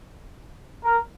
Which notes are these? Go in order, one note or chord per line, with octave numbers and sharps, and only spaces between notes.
A#4